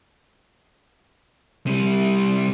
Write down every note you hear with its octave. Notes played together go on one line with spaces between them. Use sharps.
C3 G3